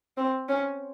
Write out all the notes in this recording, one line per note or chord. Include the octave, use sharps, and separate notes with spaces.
C4
C#4